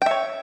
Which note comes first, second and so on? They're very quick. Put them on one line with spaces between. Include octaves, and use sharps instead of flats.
G5 E5 C#5